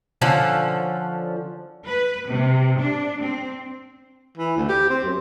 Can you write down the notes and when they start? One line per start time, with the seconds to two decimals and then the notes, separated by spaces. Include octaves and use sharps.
0.21 D3 F3 C#4
1.86 B4
2.29 C3
2.79 D4
3.20 C4
4.38 E3
4.57 D2
4.69 G4
4.90 C4
5.03 F#2